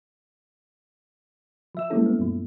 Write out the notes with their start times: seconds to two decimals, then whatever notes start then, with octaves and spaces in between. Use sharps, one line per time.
1.75 F3 E5 E6
1.90 G3 G#3 A#3 C#4 E4 A4
2.06 B3
2.19 F#2 A#2 F3